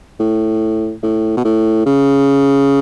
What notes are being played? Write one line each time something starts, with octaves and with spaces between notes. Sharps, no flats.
A2
A2
B2
A2
C#3